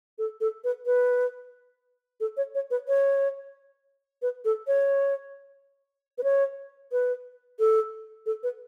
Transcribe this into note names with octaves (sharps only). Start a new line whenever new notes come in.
A4
A4
B4
B4
A4
C#5
C#5
B4
C#5
B4
A4
C#5
B4
C#5
B4
A4
A4
B4